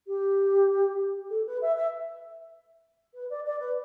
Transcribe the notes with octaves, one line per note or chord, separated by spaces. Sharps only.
G4
A4
B4
E5
E5
B4
D5
D5
B4